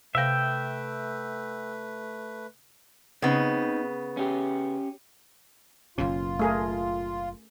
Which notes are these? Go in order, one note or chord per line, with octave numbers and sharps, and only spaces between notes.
C3 A3 B4 E5 F5 G5 A#6
C#3 B3 C4 D#4
C#4 G4
F#1 F#2 B2 C#4 F4
A3 G#4 A#4